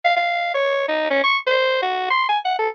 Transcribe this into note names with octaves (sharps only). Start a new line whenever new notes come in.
F5
F5
C#5
D#4
C#4
C#6
C5
F#4
C6
G#5
F#5
A4